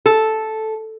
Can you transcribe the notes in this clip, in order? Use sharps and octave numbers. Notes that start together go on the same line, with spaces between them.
A4